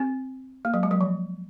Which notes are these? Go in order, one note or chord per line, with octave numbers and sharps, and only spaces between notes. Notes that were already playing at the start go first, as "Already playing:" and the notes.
Already playing: C4
A#3
F#3
G#3
F#3
F3